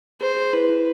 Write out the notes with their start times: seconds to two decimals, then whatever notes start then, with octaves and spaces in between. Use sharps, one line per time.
0.21 G#4 C5
0.37 G#4
0.53 E4 B4
0.69 E4